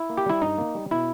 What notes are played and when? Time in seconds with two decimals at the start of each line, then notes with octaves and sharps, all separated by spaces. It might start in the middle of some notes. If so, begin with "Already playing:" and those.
Already playing: E4
0.10 A#3
0.17 G4
0.26 G3 E4
0.42 G2 D#4
0.58 A#3
0.75 G3
0.91 B2 E4